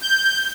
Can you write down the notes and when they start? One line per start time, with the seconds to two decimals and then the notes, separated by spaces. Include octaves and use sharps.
0.02 G6